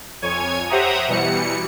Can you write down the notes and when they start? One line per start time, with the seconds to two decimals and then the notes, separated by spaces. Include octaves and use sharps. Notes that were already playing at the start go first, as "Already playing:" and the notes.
0.22 F2 C#5 G#5 G#6
0.69 G4 C5 E5 F#5 A#5 D#6
1.08 B2 E3 G3 C#7